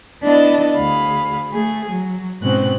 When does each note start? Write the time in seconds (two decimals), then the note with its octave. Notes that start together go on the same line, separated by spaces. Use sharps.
0.22 B3 D4 E4 D#5 A5
0.75 D2 G#4 F5 B5
1.51 A3 G#4
1.90 F#3
2.42 G#2 B2 C4 C#4 F#6